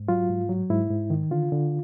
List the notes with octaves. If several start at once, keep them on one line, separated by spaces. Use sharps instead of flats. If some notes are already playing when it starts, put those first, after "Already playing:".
Already playing: G#2
F#3 F4
G#2
F#3
G#2 E4
G#2
D#3
D3 F4
D3